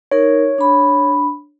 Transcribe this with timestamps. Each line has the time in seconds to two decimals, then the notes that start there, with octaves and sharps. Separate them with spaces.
0.12 D#4 A#4 C#5
0.58 D4 B5